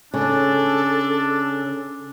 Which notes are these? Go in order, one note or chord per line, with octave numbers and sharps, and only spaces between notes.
C#3 D4 A4